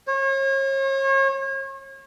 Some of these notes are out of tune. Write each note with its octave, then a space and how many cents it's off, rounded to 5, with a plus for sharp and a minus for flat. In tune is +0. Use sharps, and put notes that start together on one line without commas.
C#5 -40